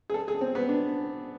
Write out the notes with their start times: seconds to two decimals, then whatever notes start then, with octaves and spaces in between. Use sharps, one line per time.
0.10 G#4
0.14 A4
0.28 G#4
0.41 C4
0.55 B3
0.69 D4